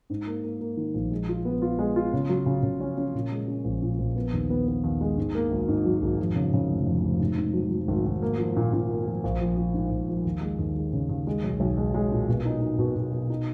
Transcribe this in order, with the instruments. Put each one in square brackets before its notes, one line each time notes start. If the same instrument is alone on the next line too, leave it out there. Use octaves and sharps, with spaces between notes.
[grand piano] G#2
A#3
A#3
A#3
D#3
A#1
G#3
F4
B3
F4
G#3
F4
C#3
F#3
C#3
C#3
C#4
C#4
A#2
G#3
C#4
A#1
A#2
A#1
B3
D#2
B3
B3
D#2
G#3
G#2
A#3
G#1
G#2
F#3
G#1
F2
C#3
C#3
F1
F2
F1
G#2
G#2
F#3
F#3
G#1
G#1
A#3
F3
A#2
A#2
A#3
F3
A#1
F3
F3
G#2
A#1
F3
D#2
G#3
D#2
G#3
C#3
D#2
G#3
B1
B1
G#3
G#3
A#2
B2
D#4
D#4
B2
B2
B2
D#4